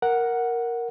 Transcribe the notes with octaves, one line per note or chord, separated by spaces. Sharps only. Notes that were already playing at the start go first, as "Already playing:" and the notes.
A#4 F#5